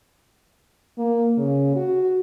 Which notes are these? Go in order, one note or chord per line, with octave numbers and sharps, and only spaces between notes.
A#3
C#3
F#4